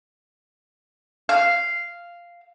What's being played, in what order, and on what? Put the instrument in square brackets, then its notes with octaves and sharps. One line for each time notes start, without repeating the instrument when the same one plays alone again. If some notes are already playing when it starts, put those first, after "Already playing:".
[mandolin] F5